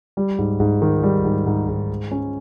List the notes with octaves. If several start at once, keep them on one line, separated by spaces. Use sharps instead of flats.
G3
G#2
G#2
D#3
G3
G#2
G#2
G#2
G#3
C#4